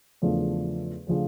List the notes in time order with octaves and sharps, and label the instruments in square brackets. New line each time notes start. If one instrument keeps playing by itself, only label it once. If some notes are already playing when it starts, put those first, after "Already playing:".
[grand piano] E2 C#3 F3 A3 D4
C#3 F3 A3 D4